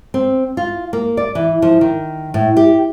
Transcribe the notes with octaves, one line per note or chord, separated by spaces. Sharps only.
C4
F4
A#3
D5
E3
F3
D#3
A2
G4